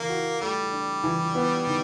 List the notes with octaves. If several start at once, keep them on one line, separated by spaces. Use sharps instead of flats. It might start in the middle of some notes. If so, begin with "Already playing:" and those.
Already playing: E3 A#3
F#4
G3 A3
D4
E3
B3
D#3